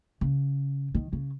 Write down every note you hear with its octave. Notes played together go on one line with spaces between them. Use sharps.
C#3
D#3
C#3